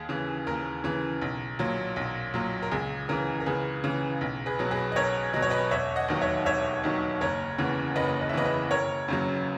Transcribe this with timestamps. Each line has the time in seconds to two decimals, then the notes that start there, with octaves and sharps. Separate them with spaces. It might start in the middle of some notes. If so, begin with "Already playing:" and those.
Already playing: D#2 G#4
0.09 C#3 E3
0.47 D#2 A#4
0.84 C#3 E3
1.22 B1
1.59 A#2 F#3
1.96 B1
2.34 A#2 F#3
2.62 A#4
2.71 C#2 G#4
3.09 C#3 E3 A#4
3.40 A#4
3.46 C#2 G#4 B4
3.84 C#3 E3
4.21 B1
4.46 G#4 B4
4.59 B2 F#3
4.71 G#4 B4
4.92 D#5
4.96 B1 A#4 C#5
5.33 B2 F#3 D#5
5.42 C#5
5.50 B4 D#5
5.71 E1 C#5 E5
5.96 D#5 F#5
6.08 D#2 D#3 F#3
6.21 C#5 E5
6.46 E1 C#5 E5
6.84 D#2 D#3 F#3
7.21 F#1 A#4 C#5
7.59 E2 C#3 E3
7.96 F#1 B4 D#5
8.21 D#5
8.29 E5
8.34 E2 C#3 E3 B4 D#5
8.45 B4 D#5
8.71 F#1 A#4 C#5
9.08 F#2 C#3 F#3